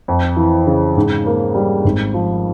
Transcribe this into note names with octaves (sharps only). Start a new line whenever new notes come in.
F2
E3
C#3
G#2
A#3
G3
G#1
F3